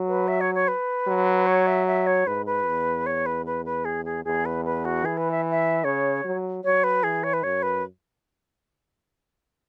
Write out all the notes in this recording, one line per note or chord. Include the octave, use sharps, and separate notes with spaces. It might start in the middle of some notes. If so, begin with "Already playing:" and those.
Already playing: F#3
B4
E5
C#5
C#5
B4
F#3
C#5
E5
E5
C#5
G#2 B4
B4
E2
C#5
B4
B4
B4
G#4
G#4
E2 G#4
B4
B4
F#4
E3 G#4
B4
E5
E5
C#3 C#5
F#3
F#3 C#5
B4
E3 G#4
C#5
B4
F#2 C#5
B4